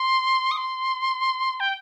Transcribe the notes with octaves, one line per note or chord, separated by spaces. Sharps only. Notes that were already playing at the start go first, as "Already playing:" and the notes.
Already playing: C6
D#6
C6
G5